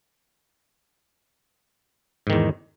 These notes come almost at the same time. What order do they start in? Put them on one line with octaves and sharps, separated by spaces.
G#2 D#3 E2